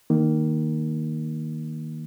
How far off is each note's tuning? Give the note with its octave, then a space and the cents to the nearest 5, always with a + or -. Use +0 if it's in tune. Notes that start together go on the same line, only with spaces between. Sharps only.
D#3 +0 A#3 +0